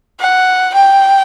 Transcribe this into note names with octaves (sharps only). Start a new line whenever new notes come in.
F#5
G5